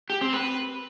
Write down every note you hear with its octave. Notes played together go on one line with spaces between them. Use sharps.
G4
C4
B4